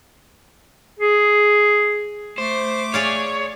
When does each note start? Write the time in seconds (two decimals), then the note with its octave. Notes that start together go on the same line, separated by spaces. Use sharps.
1.00 G#4
2.38 A3 C5 D6
2.94 G#4 C#5 D5 F5